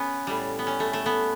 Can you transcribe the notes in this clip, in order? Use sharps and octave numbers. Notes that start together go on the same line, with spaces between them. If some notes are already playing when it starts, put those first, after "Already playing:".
Already playing: B3 C#4
A2 G3
B3
C#4
A3
A3
B3